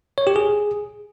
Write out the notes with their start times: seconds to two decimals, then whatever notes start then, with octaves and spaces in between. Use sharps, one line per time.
0.18 C#5
0.27 G4
0.36 G#4